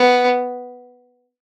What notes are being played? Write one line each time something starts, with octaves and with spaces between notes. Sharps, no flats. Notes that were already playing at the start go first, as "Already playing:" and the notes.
Already playing: B3